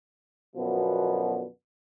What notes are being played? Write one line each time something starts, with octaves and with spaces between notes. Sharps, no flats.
F#2 B2 D3 F3 B3